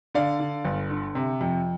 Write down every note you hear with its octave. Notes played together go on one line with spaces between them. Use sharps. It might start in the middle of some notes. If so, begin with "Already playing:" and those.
D3 D5 F5
D3
G1
D3
C3
F2